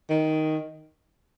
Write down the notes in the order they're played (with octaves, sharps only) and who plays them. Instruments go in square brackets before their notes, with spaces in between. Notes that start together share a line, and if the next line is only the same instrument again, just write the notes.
[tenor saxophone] D#3